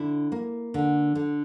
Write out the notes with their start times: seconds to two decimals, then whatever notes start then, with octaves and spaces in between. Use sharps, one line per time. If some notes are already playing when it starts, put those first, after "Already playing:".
Already playing: D3 E4
0.32 A#3
0.74 D3
1.15 D3